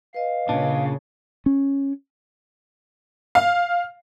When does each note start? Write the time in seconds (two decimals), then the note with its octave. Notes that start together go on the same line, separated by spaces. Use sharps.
0.14 B4 D#5 F5
0.49 A#2 C#3 D4
1.46 C#4
3.35 F5